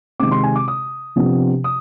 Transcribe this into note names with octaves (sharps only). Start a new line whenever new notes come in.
C3 D#3 G#3 C4 D6
C6
G#5
D6
D#6
C3 F3 B3 D4
D#6